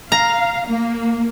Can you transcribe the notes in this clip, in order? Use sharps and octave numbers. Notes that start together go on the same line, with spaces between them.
F5 A#5
A#3